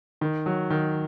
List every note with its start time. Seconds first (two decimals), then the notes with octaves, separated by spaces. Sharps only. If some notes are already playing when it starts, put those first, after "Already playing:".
0.21 D#3
0.46 F#3
0.70 D#3